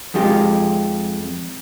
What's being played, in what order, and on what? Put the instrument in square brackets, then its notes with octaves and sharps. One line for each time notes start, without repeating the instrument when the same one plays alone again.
[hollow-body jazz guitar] F2 G#3 F4 G4